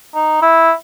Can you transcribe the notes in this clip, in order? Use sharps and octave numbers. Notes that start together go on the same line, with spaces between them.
D#4
E4